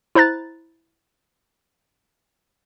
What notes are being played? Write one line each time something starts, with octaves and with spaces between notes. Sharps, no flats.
E4 C5 A#5 F#6 A6